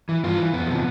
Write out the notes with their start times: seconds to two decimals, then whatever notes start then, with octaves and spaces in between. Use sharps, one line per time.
0.09 E3
0.24 G2 F4
0.38 E3
0.53 F2 B3
0.68 C3 F3